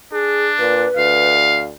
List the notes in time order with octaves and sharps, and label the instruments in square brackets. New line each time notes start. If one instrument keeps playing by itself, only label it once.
[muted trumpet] D4 [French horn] G#4
[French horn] A#2 [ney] B4
[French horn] D2 [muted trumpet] F5